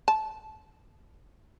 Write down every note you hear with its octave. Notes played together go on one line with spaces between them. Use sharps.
A5